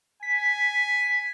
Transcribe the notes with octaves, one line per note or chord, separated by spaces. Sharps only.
G#5 B6